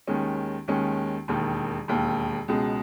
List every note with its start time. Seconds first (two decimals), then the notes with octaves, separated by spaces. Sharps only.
0.07 D#2 D#3 G#3 C#4
0.68 D#2 D#3 G#3 C#4
1.28 E1 D#2 D#3
1.88 E1 D#2 D#3
2.48 C#2 B2 G#3